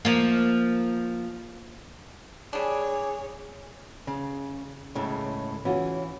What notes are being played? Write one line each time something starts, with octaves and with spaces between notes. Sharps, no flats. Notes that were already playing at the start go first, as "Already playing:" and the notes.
F3 A#3
G3 D4 G#4 C#5
C#3
C#2 A2 C#3
E3 C#4 F4 F#4